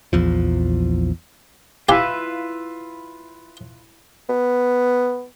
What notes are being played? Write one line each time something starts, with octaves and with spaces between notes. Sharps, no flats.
A#1 E2 F3
E4 F4 G4 B4 E5 F5 G#5
B3